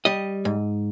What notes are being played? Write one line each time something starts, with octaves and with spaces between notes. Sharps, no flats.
G3 D#5
G#2